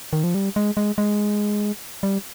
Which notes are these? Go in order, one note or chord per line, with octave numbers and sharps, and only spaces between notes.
D#3
F3
G3
G#3
G#3
G#3
G3